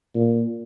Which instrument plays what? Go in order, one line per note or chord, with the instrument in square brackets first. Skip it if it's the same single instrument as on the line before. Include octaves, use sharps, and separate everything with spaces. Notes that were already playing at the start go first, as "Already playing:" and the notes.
[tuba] A#2